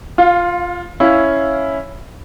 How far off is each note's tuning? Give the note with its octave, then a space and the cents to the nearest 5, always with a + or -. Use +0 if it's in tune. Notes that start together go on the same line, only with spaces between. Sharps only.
F4 +0 F5 +30
C#4 +0 E4 +0 F5 +0